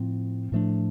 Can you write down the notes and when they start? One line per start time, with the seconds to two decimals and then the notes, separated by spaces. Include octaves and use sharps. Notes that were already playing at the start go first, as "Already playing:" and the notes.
Already playing: A2 F3 C4
0.52 A2 F3 A3 D4